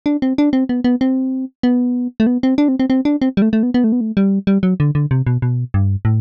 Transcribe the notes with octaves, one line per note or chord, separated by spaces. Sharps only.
D4
C4
D4
C4
B3
B3
C4
B3
A3
B3
C4
D4
C4
C4
C4
D4
C4
G3
A3
A3
B3
B3
A3
B3
A3
G3
G3
F#3
D3
D3
C3
B2
B2
G2
A2